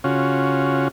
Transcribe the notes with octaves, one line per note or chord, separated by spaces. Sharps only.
C#3 C#4 F4 F#4